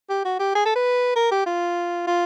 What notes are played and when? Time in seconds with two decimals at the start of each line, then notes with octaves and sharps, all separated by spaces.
0.09 G4
0.25 F#4
0.40 G4
0.55 G#4
0.65 A4
0.75 B4
1.16 A#4
1.31 G4
1.46 F4
2.07 F4